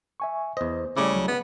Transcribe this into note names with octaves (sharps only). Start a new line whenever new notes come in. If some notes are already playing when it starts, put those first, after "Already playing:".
E5 G#5 C#6
E2 C5 D#5
C#3 G3 A3 E4 D6
D2 F#3
B3